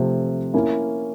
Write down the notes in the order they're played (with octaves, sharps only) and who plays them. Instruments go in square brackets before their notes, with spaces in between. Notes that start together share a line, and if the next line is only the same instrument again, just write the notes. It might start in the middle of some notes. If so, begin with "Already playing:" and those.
Already playing: [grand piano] C3 F3 A3 C4
A#3 C#4 E4